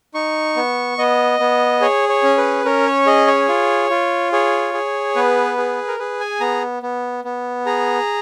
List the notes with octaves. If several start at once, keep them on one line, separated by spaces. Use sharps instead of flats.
D#4 C#6
B3
B3 D#5
B3
G#4 C#5
C#5
C#4
B4
C#4 A#4
C#5
G#4 D#5
C#5
F4
F4
G#4 C#5
G#4
B3 B4
G#4
A#4
G#4 B4
G#5
B3 A#5
B3
B3
G#4 A#5